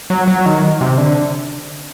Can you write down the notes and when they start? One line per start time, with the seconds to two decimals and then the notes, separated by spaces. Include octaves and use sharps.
0.10 F#3
0.28 F#3
0.46 D#3
0.81 C3
0.98 D3